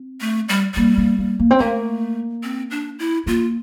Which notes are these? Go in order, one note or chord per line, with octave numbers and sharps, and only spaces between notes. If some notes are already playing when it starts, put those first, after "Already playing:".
Already playing: C4
A3
G3
G3 A#3
A#3
A#3
A#3
C4
A3 A#3
C4
D4
E4
A#3 F4